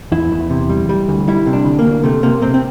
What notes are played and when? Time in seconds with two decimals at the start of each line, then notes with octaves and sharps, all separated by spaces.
0.12 E2 E4
0.32 E2
0.50 C3
0.69 G3
0.89 G3
1.09 D2
1.28 G3 E4
1.46 C3
1.53 D4
1.65 D2
1.79 A#3
1.85 D2
2.03 C3 A3
2.23 C3 A#3
2.42 C3 C4
2.54 C4